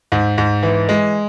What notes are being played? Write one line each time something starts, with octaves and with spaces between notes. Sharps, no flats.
G#2
G#2
E3
G#3